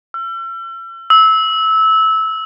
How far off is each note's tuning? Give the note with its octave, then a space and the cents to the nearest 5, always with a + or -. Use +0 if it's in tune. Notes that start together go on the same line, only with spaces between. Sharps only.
E6 +45
E6 -20